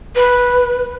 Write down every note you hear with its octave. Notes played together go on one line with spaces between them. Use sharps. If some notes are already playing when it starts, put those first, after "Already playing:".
B4